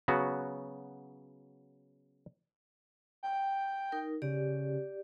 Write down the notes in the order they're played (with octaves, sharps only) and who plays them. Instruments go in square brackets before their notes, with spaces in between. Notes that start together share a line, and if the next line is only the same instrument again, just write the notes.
[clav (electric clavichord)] C#3 F#3 B3 F#4
[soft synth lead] G5
[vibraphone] D#4 A#4
[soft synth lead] C#3 [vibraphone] G4 D5